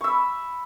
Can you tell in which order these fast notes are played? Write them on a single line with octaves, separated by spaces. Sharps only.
C#6 E6 B5